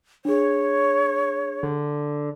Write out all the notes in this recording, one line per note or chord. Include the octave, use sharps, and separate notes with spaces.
D4 G#4 C#5
D3